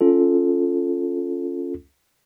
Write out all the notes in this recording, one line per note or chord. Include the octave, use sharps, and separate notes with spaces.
C#4 F4 A4